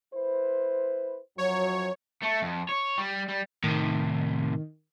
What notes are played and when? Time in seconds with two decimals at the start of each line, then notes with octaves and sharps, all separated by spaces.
0.14 E4 B4 C5
1.38 F#2 F3 F#3 C#5
2.22 A3
2.42 F2
2.69 C#5
2.98 G3
3.28 G3
3.64 A2 C3 D#3